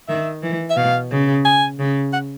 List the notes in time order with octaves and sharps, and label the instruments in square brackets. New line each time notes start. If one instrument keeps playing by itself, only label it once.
[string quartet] D#3 [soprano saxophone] E5
[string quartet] E3
[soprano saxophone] E5
[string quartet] B2 [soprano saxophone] F5
[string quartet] C#3
[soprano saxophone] G#5
[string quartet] C#3
[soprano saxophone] F#5